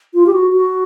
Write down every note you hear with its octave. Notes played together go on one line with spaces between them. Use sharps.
F4
G4
F#4
F#4